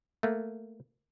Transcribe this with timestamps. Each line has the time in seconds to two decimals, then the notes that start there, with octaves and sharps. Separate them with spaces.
0.23 A3 A#3